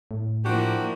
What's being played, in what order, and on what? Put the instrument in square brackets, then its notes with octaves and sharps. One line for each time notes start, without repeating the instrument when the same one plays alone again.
[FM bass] A2
[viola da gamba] F3 A#3 E4 [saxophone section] D4 F#4 G4